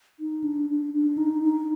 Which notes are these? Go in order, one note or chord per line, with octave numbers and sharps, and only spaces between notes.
D#4
D4
D4
D4
D#4
D#4